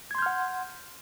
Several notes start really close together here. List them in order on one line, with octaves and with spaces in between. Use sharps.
G#6 C6 G6 F6 F#5